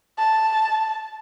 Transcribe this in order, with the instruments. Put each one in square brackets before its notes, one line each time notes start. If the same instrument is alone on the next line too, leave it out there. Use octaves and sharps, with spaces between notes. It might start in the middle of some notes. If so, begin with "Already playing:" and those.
[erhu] A5